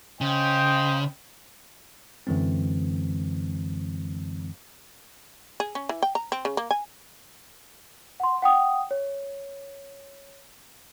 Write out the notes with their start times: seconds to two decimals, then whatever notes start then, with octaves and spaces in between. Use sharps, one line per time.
0.21 C#3 C5 D#5 G5
2.27 F#2 D3 E3 G#3 C4
5.60 G#4
5.75 C#4
5.89 E3
6.02 G5
6.15 A#5
6.32 C4
6.45 C#3
6.57 A#3
6.71 G#5
8.20 F#5 C6
8.42 F#5 G5 D#6
8.91 C#5